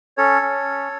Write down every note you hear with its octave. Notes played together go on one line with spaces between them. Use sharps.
C#4 A4 C#5
C#4